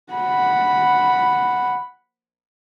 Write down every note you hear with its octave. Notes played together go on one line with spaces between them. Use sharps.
F#5 B5